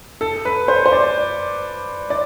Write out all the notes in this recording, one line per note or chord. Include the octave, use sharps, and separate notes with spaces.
A4
B4
C5
C5
D5
D5